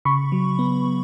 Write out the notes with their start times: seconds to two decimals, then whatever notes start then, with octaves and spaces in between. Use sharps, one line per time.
0.05 C#3 B5 C#6
0.32 F#3
0.59 B3